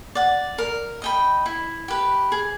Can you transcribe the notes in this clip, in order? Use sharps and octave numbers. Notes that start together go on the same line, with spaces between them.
D5 F#5
A#4
D#5 G5 B5
E4
G4 B4
G#4